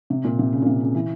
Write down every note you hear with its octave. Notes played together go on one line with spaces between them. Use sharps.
C3
A#2
C3
C#3
A#2
C3
C#3
E3